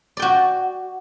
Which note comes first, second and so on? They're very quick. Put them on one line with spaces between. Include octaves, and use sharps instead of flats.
D5 G5 F#4